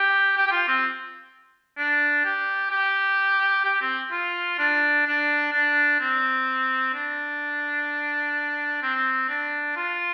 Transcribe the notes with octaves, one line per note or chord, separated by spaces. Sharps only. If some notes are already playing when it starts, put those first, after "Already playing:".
Already playing: G4
G4
G4
F4
C4
D4
G4
G4
G4
C4
F4
D4
D4
D4
C4
D4
C4
D4
F4